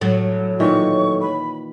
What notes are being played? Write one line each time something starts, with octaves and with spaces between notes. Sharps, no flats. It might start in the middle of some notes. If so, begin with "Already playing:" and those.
A2 F#3 C#5
A#2 D#3 E3 C#6
B5